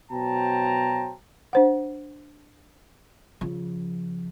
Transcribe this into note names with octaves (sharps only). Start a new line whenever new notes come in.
B2 F#3 C5 G5 A5 A#5
D4 C5 F#5
C#3 F3